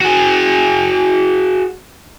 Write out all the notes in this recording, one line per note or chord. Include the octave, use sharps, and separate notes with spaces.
F#4 G#4